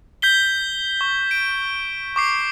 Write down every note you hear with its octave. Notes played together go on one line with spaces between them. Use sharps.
G6 B6 G7
C#6
D7
C#6 D6 C7